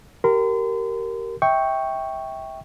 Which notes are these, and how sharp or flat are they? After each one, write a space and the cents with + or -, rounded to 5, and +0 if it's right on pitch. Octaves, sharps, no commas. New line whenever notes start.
G4 -20 A#4 -10 C6 -40
E5 -25 G5 +0 C#6 +0